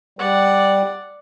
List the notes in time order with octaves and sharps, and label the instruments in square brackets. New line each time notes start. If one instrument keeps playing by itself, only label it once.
[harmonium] G3 [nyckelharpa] D5 F#5